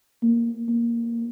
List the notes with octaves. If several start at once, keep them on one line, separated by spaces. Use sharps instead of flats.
A#3
A#3